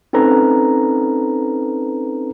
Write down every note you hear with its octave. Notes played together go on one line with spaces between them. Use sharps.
C4 C#4 D#4 A4 B4 A#5